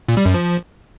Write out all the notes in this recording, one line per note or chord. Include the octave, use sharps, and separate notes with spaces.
A#2
G3
F#2
F3